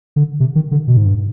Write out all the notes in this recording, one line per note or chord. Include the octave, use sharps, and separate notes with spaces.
D3
C3
D#3
D3
B2
G#2
G2